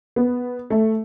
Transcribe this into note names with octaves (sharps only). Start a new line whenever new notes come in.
B3
A3